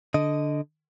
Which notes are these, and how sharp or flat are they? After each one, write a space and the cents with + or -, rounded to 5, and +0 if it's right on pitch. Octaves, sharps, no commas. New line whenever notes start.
D3 +0 D#5 +0